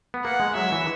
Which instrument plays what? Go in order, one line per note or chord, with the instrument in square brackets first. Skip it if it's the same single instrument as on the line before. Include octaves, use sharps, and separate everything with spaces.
[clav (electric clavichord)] B3
[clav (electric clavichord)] A#3 [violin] F#5
[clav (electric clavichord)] G#3
[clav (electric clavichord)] F#3 [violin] E5
[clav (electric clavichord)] E3